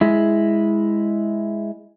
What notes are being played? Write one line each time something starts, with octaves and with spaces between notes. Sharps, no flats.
G#3 E4